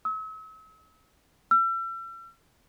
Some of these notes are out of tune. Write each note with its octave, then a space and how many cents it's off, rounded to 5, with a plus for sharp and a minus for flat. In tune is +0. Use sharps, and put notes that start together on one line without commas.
E6 -40
E6 +40